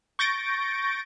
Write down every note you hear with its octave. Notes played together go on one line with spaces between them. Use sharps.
C#6 G6 A6 A#6 D7